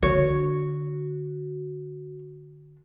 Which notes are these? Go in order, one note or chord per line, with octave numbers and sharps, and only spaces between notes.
D3 F#4 C#5